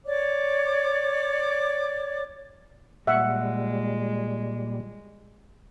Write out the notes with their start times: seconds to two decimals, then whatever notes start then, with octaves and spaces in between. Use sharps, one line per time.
0.05 C#5 D5 D6
3.07 A#2 G3 G#3 E5 F#5